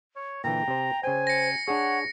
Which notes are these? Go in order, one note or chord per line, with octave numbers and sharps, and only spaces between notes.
C#5
A#2 D3 E3 G5 A#5
C3 C5
C#3 C5 G5 G#5
A#6 C#7
D4 G#4 C#5 F#5